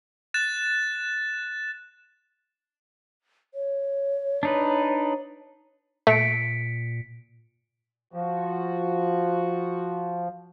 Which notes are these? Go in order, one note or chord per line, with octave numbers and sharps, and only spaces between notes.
F#6 A6 E7
C#5
D4 D#4 B4
A#2 A3 B6 C#7 D7
F3 F#4